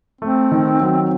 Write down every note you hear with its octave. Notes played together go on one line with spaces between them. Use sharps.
A3 C4
D#3
F#3